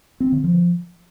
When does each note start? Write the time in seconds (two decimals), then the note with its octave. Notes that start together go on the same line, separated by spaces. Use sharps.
0.20 C4
0.32 D3
0.44 F3